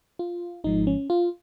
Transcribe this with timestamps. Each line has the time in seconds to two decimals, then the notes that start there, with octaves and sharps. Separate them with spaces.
0.19 F4
0.64 G#1 G#2 F3 G#3 D#4
0.87 C#4
1.10 F4